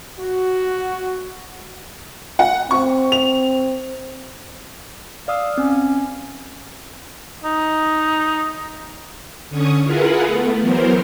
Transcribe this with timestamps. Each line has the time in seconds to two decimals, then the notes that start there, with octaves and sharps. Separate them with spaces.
0.19 F#4
2.39 F#5
2.71 C4 C#6
3.12 F7
5.28 D5 F5 D#6 E6
5.58 C4 C#4
7.44 D#4
9.50 D3 C#4 C#6 D#6
9.82 E4 F4 G#4 A#4 B4 F#5
10.27 A3 B3
10.60 E3 F#3 B3 A#4 C5